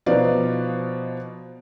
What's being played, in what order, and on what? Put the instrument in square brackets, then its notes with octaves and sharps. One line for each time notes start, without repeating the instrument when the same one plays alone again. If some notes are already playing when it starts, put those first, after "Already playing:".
[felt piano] B2 F3 D#4 B4 D5 F5